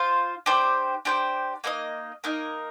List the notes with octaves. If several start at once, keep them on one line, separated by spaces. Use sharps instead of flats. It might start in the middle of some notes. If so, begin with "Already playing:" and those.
Already playing: F4 C5 F5
D4 G4 C5 G5
D4 G4 C5 G5
A#3 D#4 A#4 D#5
A#3 D#4 A#4 D#5